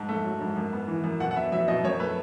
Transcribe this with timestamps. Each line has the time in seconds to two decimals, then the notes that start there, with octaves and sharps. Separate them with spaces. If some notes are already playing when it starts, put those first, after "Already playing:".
Already playing: G#2 A5
0.09 A3
0.24 F#3
0.40 G#2
0.56 F#2
0.73 B3
0.88 E3
1.04 F#2
1.20 B2 F#5
1.31 F#5
1.36 B3 E5
1.52 F#3 E5
1.68 B2 D#5
1.84 F#2 C#5
2.00 A3 B4